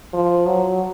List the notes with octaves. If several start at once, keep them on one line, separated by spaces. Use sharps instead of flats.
F3
F#3